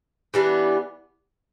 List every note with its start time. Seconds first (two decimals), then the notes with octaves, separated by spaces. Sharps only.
0.34 E3 G3 B3 D4